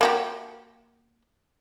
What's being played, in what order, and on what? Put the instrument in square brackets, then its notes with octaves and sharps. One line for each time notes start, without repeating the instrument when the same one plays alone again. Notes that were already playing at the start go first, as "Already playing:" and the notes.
[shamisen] A#3 F#4 G4